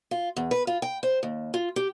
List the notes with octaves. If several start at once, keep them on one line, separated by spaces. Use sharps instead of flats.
F4
E2
B4
F4
G5
C5
D#2
F4
G4